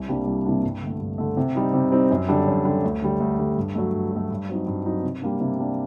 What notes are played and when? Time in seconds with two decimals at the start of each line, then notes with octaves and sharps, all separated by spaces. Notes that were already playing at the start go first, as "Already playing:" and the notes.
Already playing: C2
0.08 C3 G3 A#3 D4
0.27 C2
0.46 C3 G3 A#3 D4
0.63 G2
0.82 D3 A3
1.00 G2
1.18 D3 A3
1.37 C3
1.55 G3 C4 D#4
1.73 C3
1.92 G3 C4 D#4
2.11 F#2
2.28 D3 G3 D4
2.47 F#2
2.65 D3 G3 D4
2.84 D2
3.02 D3 G3
3.20 D2
3.38 D3 G3
3.57 G2
3.75 F#3 A3
3.94 G2
4.12 F#3 A3
4.30 G2
4.49 F#3 C4 D#4
4.67 G2
4.86 F#3 C4 D#4
5.03 C3
5.22 G3 A#3 D4
5.40 C3
5.59 G3 A#3 D4